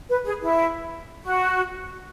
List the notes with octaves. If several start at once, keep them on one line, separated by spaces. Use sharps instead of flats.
B4
G#4
E4
F#4